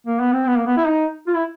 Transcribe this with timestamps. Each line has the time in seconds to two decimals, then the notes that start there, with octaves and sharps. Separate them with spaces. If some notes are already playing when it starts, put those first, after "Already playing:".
0.07 A#3
0.20 B3
0.33 C4
0.47 B3
0.57 A#3
0.66 B3
0.77 E4
0.87 D#4
1.27 F4
1.35 E4